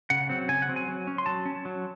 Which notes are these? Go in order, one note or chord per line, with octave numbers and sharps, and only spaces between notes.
C#3 F#5
F#3 C4
C#3 G#5
F#5
F#3 C4
G#5
F#3
C#4
C6
F#3 A5
C#4
F#3